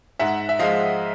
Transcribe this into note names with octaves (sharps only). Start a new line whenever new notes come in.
G#2 E5 F#5
E5
F3 G#3 D#5 F5